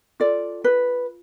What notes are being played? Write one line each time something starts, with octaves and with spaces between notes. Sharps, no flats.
F4 A4 D5
B4